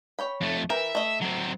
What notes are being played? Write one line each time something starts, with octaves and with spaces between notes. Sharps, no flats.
C#5 G5 B5
F2 A3
E3 A#4 E5 G5
A3 D#5
F#3 C4